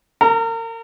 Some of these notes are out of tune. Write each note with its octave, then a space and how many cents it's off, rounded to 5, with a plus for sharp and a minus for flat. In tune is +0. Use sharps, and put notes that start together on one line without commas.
A#4 -35 A#5 +0